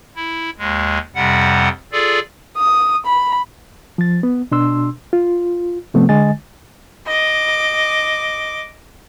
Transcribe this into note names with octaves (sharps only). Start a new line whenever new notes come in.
E4
D#2 G#3
F2 C3 G3 F#5
F4 G#4 A4 D5
D#6
B5
F3 A6
B3
B2 D4 C6 E6
F4
C3 F3 A3 B3 C4
D3 G#3 D#5 G#5 A6
D#5 D6